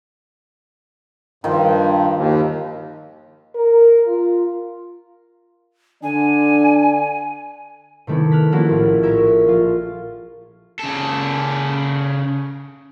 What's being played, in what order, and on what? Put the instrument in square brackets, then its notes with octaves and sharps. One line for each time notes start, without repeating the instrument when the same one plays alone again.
[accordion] G2 [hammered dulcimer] D#3 F3
[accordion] D#2
[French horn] A#4
F4
[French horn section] D3 D4 [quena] G#5
[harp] C3 D#3 A3 B3 E4
F6 F#6 A6 B6
F3 A#3 C#4 E4 F#4
A#1 A2
C#4 A#4 E5 G#6
F3 F4
[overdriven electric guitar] C#3 A4